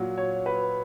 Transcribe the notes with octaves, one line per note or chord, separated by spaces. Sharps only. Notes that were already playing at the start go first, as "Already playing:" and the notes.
Already playing: A#2 F#3
C#5
B4